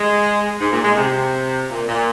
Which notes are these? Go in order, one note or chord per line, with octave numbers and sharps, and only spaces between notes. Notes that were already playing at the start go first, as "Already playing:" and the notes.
Already playing: G#3
G#2
A#2
G#3
C3
A#2
A#2